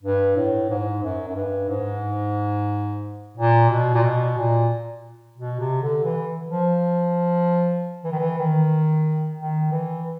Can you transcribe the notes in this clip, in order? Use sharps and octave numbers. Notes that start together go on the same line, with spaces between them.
G2
A2
G#2
F#2
F#2
G2
G#2
A#2
B2
A#2
B2
A#2
B2
C3
D3
E3
F3
E3
D#3
E3
D#3
D#3
E3